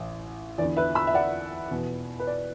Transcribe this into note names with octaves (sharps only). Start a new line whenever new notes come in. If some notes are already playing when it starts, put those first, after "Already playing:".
Already playing: A1 A2
E2 D3 B3 D5
B4 E5
B5 E6
E5
D5 F#5
E2 B2 B3
B4
D5